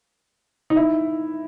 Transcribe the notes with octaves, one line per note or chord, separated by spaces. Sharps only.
D#4
E4